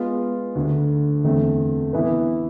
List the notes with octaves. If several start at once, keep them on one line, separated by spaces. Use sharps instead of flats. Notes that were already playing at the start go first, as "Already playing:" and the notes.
Already playing: G#3 B3 F4
D2 D3 A3
E2 D3 A3 C4
E3 B3 E4 B4